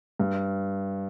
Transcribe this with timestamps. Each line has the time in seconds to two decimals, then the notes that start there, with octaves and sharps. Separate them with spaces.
0.19 G2